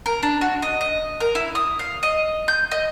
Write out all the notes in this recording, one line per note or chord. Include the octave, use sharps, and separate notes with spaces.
A#4
D4
F#4
D#5
D#5
A#4
E4
D#6
F5
D#5
G6
D#5